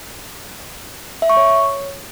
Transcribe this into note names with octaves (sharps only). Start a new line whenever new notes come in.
E5
C#6
C#5